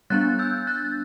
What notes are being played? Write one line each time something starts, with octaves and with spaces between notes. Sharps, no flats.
G3 B3 D4 F#6 A6
E6 G6
F#6 A6